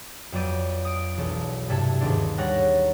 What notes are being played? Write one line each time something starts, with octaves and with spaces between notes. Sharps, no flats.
F2 F#3 B3 D5 G6 D#7
D#6 D7
E1 B1
G2 C3 A4 E5 G#6 C#7
D#2 G#2 D#3 B3 C4 D4
G3 C#5 F#5 A#5 C#6 F#6